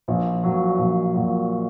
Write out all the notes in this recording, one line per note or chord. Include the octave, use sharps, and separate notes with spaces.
A#1
A#2 F#3
A#1
A#2 F#3